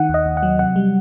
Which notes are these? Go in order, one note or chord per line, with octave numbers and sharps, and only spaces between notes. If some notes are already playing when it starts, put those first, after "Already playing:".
Already playing: D#3 F#5
D#2 D#5
D#2
F#5
F#3
C3 F#5
G3